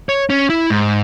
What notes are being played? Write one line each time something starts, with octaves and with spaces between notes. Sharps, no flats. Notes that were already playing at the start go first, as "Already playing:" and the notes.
C#5
C#4
E4
G#2